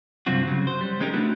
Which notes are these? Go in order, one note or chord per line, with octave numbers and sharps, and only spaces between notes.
G2 C3 F#3 C4 F4 F#4
C#3 F#3
C5
G3
G#3 C#4 D#4 G4 A4 A#4
A3 B3 D4 E4 F#4 G4